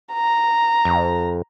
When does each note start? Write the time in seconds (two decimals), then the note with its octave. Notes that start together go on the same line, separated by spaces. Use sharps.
0.13 A#5
0.85 F2